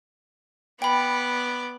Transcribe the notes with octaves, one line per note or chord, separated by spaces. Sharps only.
B3 D5 G5 B5